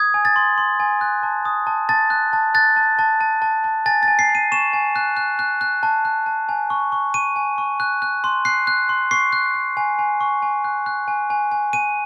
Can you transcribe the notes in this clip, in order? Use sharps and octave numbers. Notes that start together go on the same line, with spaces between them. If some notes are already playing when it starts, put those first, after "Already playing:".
Already playing: D#6 G#6
G#5
A6
C6
C6
G#5
F#6
A5
D#6
A5
A5 A6
F#6
A5
F#6 A6
A5
A5
A5
A5
A5
G#5 A6
G#5 A6
C7
G#5
D#7
C#6 E7
G#5
F#6
F#6
F#6
F#6
A5
F#6
A5
G#5
C#6
C#6
C#6 D#7
G#5
C#6
F#6
F#6
C6
F#6 C7
F#6
C6
C#6 C7
F#6
F#6
G#5
G#5
C#6
G#5
F#6
F#6
G#5
G#5
G#5
G#5 D#7